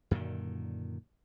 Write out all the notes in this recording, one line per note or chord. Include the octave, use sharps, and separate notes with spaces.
F#2 A#2 D3 D#3